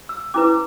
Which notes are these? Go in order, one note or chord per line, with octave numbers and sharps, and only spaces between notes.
E6
C#4 E4 B4 D6